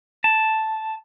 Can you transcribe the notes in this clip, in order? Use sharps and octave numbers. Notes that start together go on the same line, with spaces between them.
A5